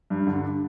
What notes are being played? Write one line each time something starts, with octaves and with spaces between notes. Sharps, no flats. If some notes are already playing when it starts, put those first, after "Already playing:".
G2
D3